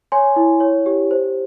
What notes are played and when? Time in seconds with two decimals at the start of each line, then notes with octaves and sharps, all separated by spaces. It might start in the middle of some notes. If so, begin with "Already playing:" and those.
0.12 C#5 G#5 C6
0.36 E4
0.60 C#5
0.86 G4
1.11 C5